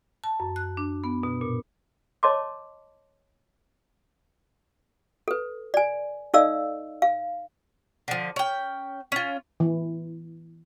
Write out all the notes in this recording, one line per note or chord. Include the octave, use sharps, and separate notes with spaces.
A5
F#2
F#6
D4
B3
B2
A#2
C#5 D#5 A5 C6 D6
A4 B4
D5 G#5
D#4 A4 D5 D#5 F5 E6
F5
D3 F3
C#4 G5
C#4 F4
E3